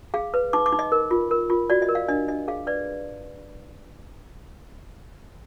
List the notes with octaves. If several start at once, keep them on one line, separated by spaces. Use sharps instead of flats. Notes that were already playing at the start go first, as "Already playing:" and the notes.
G#4 F5
B4
D#4 D6
D6
D#4
D#5
A#4
F4
A#4
F4
F#4 D5
D#5
A#4
F5
D4 D#5
D4 D#5
G#4 F5
B4 D5